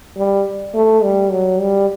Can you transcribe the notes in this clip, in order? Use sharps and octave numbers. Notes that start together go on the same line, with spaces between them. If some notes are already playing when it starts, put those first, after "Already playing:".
G3
A3
G3
F#3
G3